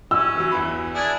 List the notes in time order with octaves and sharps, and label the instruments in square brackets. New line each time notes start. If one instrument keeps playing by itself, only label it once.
[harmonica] C#4 [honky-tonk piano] E6
[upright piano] E3 F#3
E2 E3 B5
[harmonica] D4 E4 G#4